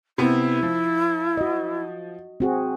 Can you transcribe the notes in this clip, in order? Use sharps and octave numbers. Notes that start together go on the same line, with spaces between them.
C3 B3 C4 E4
F3
F#4 D#5
C4 F#4 G#4